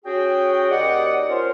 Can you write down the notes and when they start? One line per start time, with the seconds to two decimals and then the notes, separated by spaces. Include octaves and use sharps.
0.05 C#4 F#4 G#4 G5
0.70 D#2 D5 D#5 F#5
1.29 C#4 F4 A#4 C5